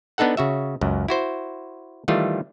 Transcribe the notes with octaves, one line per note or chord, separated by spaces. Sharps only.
B3 D4 D#4 A4 F#5
C#3 F#4 E5
C#2 F#2
E4 F#4 C5
D#3 E3 G3 A3 F4